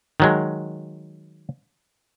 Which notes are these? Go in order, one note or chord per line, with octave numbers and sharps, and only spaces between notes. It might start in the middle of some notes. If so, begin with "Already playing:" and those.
D#3 F#3 G#3